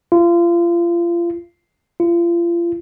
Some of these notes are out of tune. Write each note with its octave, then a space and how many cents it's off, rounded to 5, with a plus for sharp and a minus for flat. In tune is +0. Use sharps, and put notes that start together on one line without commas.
F4 -30
F4 -35